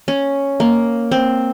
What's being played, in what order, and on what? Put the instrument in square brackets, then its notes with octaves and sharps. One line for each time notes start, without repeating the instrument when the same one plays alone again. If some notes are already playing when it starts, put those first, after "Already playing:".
[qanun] C#4
A#3
C4